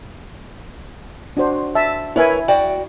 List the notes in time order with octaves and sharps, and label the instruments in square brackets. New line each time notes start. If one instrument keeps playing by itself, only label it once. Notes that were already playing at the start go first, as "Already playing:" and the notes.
[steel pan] D4 F#4 C5
E5 A5
[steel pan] E4 E5 G#5 [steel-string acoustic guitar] A#4 B4 C#5
[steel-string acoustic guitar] F#4 D5 G5